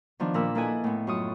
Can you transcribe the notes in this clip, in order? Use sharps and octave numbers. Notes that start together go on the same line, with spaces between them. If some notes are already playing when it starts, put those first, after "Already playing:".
D#3 F3 B3 D4
A#2 A#4 B5 E6
A#3 E4 A4 B4 D#5 G#5
A2 B3
F#2 F4 C#6 D#6